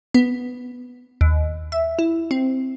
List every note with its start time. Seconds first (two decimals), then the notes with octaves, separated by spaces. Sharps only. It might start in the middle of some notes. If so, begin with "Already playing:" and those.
0.14 B3
1.21 D#2
1.72 E5
1.99 E4
2.31 C4